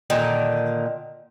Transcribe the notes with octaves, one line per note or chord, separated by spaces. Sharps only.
A#2 D3 D#3